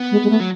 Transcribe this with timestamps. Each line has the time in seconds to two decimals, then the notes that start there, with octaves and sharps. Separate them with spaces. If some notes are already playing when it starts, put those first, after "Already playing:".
Already playing: B3
0.11 G#3
0.23 G#3
0.30 A3
0.40 F#3